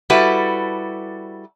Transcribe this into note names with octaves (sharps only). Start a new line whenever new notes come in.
G3 E4 F#4 A4 B4